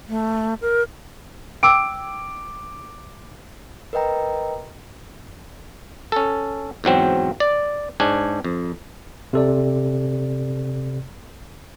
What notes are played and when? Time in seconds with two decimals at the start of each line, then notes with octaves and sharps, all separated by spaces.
0.09 A3
0.61 A#4
1.63 G5 D6 E6 D7
3.93 A#4 B4 D#5 G5 A#5
6.12 C#4 A4
6.84 E2 G#2 F#3 C4
7.40 D5
8.00 G#2 D4 C#5 G#5
8.44 F2
9.33 C3 A4 D5